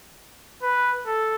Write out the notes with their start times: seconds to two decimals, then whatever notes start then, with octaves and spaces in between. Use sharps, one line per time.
0.63 B4
1.07 A4